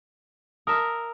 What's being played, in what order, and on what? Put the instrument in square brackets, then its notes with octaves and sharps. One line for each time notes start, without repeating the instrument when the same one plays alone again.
[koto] A#4 E5 [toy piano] A5 D#6